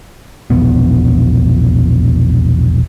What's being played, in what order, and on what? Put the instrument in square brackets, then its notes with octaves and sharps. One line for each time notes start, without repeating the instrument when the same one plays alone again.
[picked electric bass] E1 A#1 B3